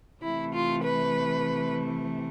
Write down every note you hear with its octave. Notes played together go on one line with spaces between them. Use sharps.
C3 E3 A3 E4
F4
B4